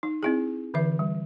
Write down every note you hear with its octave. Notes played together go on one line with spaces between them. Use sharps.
D#4
C4 E4 G#4
D3 E3 B4 E5
G3